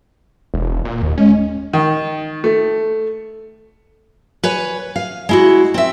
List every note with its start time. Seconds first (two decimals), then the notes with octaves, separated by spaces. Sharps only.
0.54 E1
0.85 A#2
1.02 D#2
1.18 G#3 C#4
1.73 D#3
2.44 A3
4.43 B4 C#5 G#5
4.96 F5
5.29 G#3 E4 F#4
5.74 C4 E5